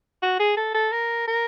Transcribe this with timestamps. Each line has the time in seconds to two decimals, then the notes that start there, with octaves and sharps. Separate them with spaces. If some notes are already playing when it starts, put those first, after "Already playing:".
0.22 F#4
0.40 G#4
0.57 A4
0.74 A4
0.92 A#4
1.27 A#4